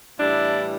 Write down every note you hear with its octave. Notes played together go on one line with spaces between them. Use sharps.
A2 E3 G3 D4 E4